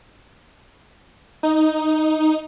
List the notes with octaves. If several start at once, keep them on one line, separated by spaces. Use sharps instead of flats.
D#4